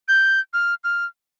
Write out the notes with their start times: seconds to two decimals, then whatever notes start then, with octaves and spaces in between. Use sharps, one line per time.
0.08 G6
0.53 F6
0.84 F6